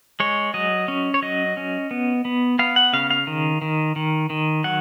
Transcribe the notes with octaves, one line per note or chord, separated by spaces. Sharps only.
G#3 C#5
F#3 D#5
C#4
C#5
F#3 D#5
C#4
B3
B3
B3 F5
F#5
C#3 F5
F5
D#3
D#3
D#3
D#3
F#3 F#5